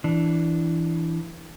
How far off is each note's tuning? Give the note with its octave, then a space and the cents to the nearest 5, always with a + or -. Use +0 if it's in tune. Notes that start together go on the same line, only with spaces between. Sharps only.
E3 +0 D4 +0